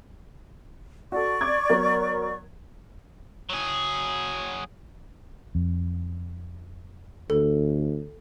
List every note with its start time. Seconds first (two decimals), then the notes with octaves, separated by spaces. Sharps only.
1.12 F#4 A4 D5 C#6
1.41 D6 G#6
1.70 F#3 B3 A#4
3.49 F#3 G#4
5.55 F2
7.30 D2 A4